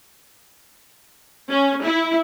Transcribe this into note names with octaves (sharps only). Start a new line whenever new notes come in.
C#4
E4